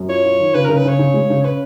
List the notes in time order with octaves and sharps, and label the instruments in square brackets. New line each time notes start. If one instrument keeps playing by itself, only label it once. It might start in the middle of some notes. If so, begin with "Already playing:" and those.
Already playing: [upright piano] F#2
[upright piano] F4 [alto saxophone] C#5
[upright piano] F4
D#3
[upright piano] C#3 [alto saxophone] B4
[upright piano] C#3 [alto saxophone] A#4
[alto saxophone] B4
[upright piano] C#3 [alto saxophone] C#5
[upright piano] C#3
G#3
C#3
[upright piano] C#4 [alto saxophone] B4